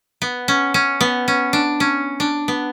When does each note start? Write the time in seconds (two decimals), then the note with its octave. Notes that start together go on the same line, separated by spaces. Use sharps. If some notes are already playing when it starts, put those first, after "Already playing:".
0.22 B3
0.48 C#4
0.74 C#4
1.01 B3
1.28 C#4
1.53 D4
1.80 C#4
2.20 D4
2.48 B3